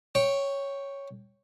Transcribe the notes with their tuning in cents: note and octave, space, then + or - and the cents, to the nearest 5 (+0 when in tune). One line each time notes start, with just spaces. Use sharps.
C#5 +0 G5 +0